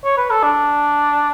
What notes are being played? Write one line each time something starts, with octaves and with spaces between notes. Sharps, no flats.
C#5
B4
A4
D4